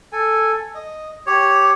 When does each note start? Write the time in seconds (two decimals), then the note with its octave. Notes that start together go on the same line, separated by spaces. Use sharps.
0.12 A4 G#5
0.75 D#5
1.26 G4 C#5